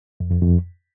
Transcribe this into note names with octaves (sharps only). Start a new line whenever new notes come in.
F2
F2
F2